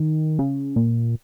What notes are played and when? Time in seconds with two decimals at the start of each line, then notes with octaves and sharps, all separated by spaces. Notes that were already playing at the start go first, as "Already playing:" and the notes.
Already playing: D#3
0.39 C#3
0.76 A#2